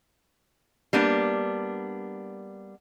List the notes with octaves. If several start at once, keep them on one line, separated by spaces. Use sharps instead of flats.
G3 A#3 B3 D4